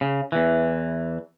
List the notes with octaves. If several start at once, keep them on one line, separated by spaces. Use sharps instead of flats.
C#3
E2 E3